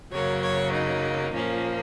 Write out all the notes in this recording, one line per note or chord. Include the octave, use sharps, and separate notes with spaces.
F#2 C#3 F#3 A#3 C#5
C#5
D#4
A#2 F3 A#3 C#4